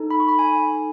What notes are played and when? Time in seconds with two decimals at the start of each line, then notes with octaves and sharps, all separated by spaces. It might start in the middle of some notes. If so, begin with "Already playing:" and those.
Already playing: D#4 A4
0.11 B5
0.20 C#6
0.29 B5
0.39 G#5